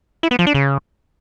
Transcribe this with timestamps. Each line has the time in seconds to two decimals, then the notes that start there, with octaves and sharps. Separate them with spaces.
0.23 E4
0.31 B3
0.39 F3
0.47 D4
0.54 C#3